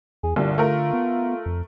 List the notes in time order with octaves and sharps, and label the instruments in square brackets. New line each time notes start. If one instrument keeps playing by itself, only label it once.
[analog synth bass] E2 [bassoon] G#4
[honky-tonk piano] C2 G2 [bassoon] A#2 [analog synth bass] D3
[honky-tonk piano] A3 A#4 [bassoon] F4
[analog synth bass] B3
F2